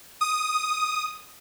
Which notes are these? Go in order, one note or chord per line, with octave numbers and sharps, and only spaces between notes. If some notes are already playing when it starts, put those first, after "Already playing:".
D#6